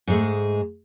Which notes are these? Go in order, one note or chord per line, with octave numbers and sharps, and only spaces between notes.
G#2 G#3 A3